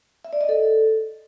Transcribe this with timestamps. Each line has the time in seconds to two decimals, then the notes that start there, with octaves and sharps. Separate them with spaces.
0.25 E5
0.33 D5
0.41 D#5
0.49 A4